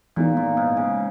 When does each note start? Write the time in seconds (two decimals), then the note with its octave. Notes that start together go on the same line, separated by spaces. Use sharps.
0.16 A#2 E3 G#3 B3 D#4
0.37 A#2
0.57 G#2
0.77 C#3